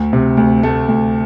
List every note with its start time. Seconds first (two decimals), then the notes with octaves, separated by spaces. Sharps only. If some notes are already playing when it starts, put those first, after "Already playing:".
Already playing: D2
0.13 C3
0.37 D2
0.63 A3
0.88 D2